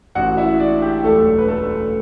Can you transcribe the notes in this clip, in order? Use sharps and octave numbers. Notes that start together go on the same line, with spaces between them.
A1 A2 E3 F#4 F#5
E4 E5
D4 D5
G4
E1 D2 D3 F#3 A3 A4
B4
A3 A4